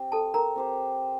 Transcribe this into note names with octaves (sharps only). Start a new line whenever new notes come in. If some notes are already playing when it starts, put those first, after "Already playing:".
Already playing: C4 G4 C5
A4 A5
A#4 A#5
C4 G4 C5